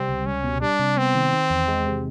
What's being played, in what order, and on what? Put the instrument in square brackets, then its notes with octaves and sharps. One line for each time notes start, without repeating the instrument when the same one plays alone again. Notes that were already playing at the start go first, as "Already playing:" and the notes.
Already playing: [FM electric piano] C3 G3 [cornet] C4
[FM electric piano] C#2
[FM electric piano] C#2 [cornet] C#4
[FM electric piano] B2
[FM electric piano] G3 [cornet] D4
[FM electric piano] C3
[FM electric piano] B3 [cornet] C4
[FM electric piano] D#3
D#3
E2
G#3
C3